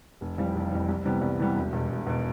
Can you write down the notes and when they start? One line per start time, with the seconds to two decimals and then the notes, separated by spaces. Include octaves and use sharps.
0.21 F1
0.38 F2 E3 G3
0.55 F1
0.71 F2 E3 G3
0.89 C2
1.05 C3 E3 G3 B3
1.22 C2
1.39 C3 E3 G3 B3
1.56 E1
1.73 E2 B2
1.90 E1
2.07 E2 B2